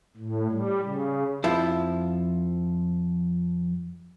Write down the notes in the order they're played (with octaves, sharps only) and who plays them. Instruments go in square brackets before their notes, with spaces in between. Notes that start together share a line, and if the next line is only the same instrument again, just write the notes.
[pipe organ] A2
G3
C#3
[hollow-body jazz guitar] F2 F3 E4